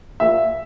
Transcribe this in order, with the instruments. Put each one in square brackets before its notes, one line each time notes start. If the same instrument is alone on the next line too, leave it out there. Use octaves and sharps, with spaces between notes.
[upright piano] A#2 E5